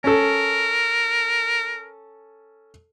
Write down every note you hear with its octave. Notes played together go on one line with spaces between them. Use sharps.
C#4 A4 A#4